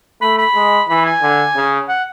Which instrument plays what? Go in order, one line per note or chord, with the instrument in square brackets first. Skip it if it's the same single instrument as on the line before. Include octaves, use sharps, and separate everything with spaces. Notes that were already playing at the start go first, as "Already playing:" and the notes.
[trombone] A3 [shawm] B5
[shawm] B5
[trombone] G#3
[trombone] E3 [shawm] B5
[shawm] G#5
[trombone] D3
C#3
[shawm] F#5